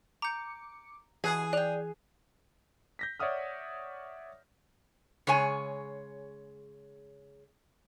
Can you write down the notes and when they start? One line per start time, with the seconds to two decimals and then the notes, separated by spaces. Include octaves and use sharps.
0.22 A#5 D6 G6 C#7
1.24 B2 E3 G#4 D#6 F#6 G#6
1.53 D5 G5 F#6 F7
2.99 G6 A#6 B6
3.20 C#5 D5 E5 F#5 D#6 F6
5.27 C#3 G#3 C#5 G#5